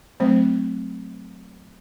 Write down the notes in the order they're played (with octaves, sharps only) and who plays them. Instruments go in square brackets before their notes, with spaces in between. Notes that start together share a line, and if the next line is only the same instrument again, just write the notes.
[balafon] F#3 A3 C4 C5